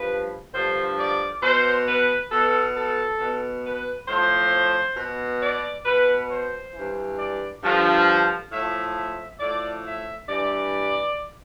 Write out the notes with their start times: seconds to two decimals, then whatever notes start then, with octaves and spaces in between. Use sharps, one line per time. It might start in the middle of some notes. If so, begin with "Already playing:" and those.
Already playing: G2 F3 B4
0.53 G2 D3 F3 C5
0.98 D5
1.42 B2 C5
1.87 B4
2.31 B2 A4
2.76 A4
3.19 B2
3.65 B4
4.08 A2 F3 C5
4.96 B2
5.42 D5
5.85 B2 B4
6.29 C5
6.74 G2 E3
7.18 D5
7.62 G2 D3 F3
8.51 A2 F3 E5
8.95 E5
9.39 A2 F3 D5
9.85 E5
10.29 G2 E3 D5